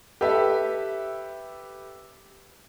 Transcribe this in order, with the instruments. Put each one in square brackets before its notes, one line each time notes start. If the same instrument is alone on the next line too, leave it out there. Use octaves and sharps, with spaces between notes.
[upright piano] G4 A4 B4 E5